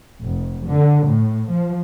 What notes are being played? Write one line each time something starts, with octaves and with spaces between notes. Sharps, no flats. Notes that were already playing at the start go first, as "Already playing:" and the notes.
F1
D3
A2
F3